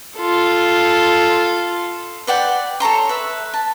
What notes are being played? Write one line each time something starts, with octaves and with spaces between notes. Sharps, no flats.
F4 A4
B4 D5 F#5 G5
A4 C#5 A#5 C6
B4 E5
A5